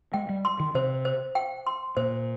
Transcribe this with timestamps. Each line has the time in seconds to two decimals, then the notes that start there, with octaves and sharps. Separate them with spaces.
0.14 G#3 G5
0.29 G3
0.45 C6
0.60 D#3
0.74 C3 C5
1.05 C5
1.35 G5
1.67 C6
1.97 A#2 C5